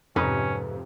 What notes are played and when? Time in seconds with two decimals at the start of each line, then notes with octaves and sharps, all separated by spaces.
0.16 F2 G#2 C3 C#4 D#4 B4